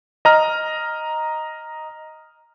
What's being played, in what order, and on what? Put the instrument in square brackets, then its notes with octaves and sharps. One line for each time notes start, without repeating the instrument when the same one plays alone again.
[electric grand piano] D#5 A#5 F6